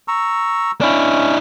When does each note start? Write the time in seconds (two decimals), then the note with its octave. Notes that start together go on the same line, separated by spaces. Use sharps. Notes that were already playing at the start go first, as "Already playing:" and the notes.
0.08 A#5 C#6 E6
0.81 C#4 D4 E4